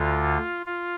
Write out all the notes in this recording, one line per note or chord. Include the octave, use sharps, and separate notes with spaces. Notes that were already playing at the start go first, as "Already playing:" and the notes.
Already playing: D2 D3 F4
F4